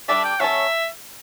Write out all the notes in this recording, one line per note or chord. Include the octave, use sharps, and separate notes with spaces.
G3 D4 A4 D5 E5
G5
F#3 C#4 F#4 A4 C#5 E5